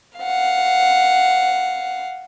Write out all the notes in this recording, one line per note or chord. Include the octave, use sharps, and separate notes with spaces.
F5 F#5